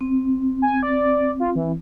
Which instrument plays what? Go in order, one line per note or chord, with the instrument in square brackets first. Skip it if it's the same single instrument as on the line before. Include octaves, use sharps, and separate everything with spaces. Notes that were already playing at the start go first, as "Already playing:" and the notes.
[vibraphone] C4
[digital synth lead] G#5
D5
F4
E3